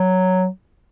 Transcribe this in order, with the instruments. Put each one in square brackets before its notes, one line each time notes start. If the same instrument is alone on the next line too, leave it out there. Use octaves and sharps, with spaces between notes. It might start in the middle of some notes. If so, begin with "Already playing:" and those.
Already playing: [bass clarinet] F#3